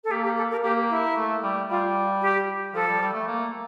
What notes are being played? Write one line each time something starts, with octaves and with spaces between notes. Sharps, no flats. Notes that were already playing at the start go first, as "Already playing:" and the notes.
A4
A#3 G4
G4
A4
A#4
A#3 G4
E4
A3
G3
G3 F4
G4
F3 A4
G3
G3
A3
A#3